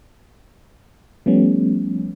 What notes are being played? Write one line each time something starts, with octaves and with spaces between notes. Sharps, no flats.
F3 G3 A3 B3 C#4